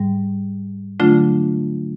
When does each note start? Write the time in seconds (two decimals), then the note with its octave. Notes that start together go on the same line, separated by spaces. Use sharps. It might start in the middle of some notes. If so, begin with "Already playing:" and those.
Already playing: G#2 G3
1.00 D3 F#3 A3 D4 F4